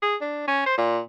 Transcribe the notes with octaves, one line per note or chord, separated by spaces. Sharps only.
G#4
D4
C#4
C5
A#2